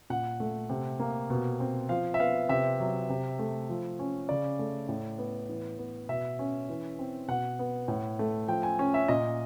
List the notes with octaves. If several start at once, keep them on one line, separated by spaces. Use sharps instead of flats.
A#2 F#5
A3
C3
A#3
B2
C4
F3 F5
E5
B3 F5
C3 E5
F#3
C3
A3
F3
C#4
C#3 D5
A3
A2
B3
E3
B3
B2 E5
C#4
E3
C4
B2 F#5
B3
A2
A3
F3 G5
G#5
C#4
E5
A#2 D#5